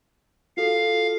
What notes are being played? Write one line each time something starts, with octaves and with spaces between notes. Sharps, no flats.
F4 F#4 A4 F5